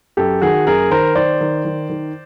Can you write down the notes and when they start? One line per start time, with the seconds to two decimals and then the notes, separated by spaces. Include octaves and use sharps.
0.17 F#2 G4 A4
0.41 D#3 F#4 G#4
0.67 F#2 G#4 A#4
0.91 D#3 A#4 C5
1.15 D#3 C5 D5
1.41 D#3
1.65 D#3
1.89 D#3